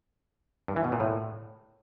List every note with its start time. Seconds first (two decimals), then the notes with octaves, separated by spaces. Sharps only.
0.68 G2
0.76 E3
0.84 B2
0.92 A#2
1.00 A2